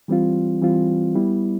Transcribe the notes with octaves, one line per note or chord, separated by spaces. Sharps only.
E3 G3 C4 F4
E3 G3 C4 F4
G3 B3 E4